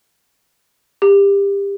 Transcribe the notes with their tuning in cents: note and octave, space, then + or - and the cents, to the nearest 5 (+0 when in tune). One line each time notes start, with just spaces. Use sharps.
G4 +25